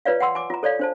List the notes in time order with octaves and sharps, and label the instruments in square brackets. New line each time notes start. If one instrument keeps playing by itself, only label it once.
[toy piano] F4 B4 C#5 D5 F5
F#5 G5 C6 E6
G#5 D6
F4 A#5
A4 C#5 D5 F5
D4 C5 A5